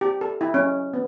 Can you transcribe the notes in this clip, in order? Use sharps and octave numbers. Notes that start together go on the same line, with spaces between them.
G4
A4
E4
C#4
B3